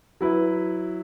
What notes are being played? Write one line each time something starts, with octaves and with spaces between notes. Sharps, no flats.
F#3 E4 B4